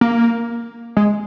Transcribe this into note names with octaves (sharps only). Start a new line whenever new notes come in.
A#3
G#3